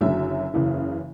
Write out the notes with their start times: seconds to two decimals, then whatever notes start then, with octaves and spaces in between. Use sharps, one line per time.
0.01 F#1 F#2 D3 F#3 E5
0.54 F#1 E2 C#3 E3